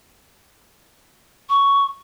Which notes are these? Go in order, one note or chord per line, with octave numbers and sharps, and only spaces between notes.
C#6